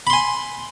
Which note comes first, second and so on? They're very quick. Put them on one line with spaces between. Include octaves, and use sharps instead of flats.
B5 C6 G#5